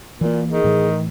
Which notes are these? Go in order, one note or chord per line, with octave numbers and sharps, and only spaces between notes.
A#2 E3 A#3
D#3 G#4
A2 E3